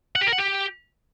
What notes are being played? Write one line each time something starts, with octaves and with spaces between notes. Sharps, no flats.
F#5
G4
A#4
F#5
G4